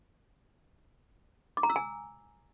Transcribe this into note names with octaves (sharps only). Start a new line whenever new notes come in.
D6
A#5
E6
G#5